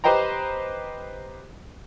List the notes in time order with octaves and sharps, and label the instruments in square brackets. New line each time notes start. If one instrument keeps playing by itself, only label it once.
[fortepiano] G4 B4 C5 D#5 G5 A#5